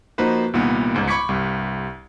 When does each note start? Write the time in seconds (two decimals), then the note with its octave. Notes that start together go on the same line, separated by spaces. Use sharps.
0.18 F3 A#3 D#4 F#4 B4 C5
0.53 C2 A#2 D#3 B3
0.94 G1 C#2 G#2
1.08 B5 C#6 D6 G#6 B6 C#7
1.29 C2 G2